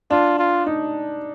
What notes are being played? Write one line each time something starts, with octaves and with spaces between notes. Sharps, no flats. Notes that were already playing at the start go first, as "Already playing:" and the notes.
D4 F4
F4
D#4